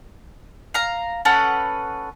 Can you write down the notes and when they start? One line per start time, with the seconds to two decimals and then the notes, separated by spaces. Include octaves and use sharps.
0.74 F5 A#5
1.25 C#4 A4 B4 F#5